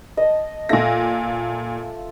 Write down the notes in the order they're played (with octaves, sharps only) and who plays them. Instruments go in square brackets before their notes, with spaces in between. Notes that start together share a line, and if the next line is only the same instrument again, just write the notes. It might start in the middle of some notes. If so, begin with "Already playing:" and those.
[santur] D#5 A5
[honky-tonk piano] A#2 A#6 [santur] F4 A4 E5